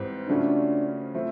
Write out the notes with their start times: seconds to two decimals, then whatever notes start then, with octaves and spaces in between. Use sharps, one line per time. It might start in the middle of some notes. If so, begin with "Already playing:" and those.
Already playing: G#2 E3 G3 C4
0.28 C#3 F3 A3 C#4 D4 F#4
1.14 F3 A3 C4 E4